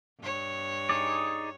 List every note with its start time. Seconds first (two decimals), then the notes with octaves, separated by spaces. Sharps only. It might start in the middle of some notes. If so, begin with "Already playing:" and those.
0.20 G2 C#5
0.89 D#4 G#4 D5